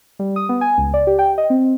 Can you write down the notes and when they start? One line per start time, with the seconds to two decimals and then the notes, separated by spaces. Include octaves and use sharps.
0.19 G3
0.36 D#6
0.49 B3
0.61 G#5
0.78 C#2
0.94 D5
1.07 G4
1.19 G5
1.38 D#5
1.50 C4